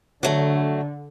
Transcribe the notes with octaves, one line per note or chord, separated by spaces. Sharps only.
D3 F#3 A3